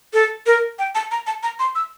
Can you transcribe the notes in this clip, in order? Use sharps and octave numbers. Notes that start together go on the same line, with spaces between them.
A4
A#4
G5
A5
A#5
A5
A#5
C6
E6